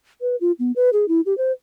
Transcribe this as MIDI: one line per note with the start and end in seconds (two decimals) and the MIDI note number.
0.21 0.36 71
0.41 0.52 65
0.59 0.72 59
0.76 0.90 71
0.93 1.08 68
1.08 1.21 64
1.26 1.36 67
1.38 1.52 72